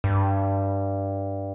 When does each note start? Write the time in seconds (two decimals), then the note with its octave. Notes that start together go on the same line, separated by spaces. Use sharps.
0.04 G2